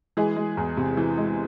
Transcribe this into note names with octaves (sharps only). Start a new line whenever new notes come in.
E3 G#3 G#4
G#3
E2
C3
E3
G#3